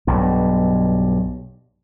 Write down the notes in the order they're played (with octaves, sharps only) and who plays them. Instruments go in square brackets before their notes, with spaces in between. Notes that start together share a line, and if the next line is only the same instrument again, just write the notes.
[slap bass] B1 G2